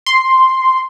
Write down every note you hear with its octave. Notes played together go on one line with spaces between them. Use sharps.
C6